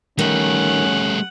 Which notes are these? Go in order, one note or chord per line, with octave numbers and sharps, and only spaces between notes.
D#3 G3 A3 C#4 F#5